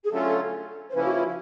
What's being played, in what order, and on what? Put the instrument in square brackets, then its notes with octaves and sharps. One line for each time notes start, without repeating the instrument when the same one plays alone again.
[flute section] G#4
[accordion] D3 F#3 A3 C#4 F4 [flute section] A4
[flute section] C5
[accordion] C#3 F3 A#3 C#4 E4 [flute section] B4
[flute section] F#4
F4
E4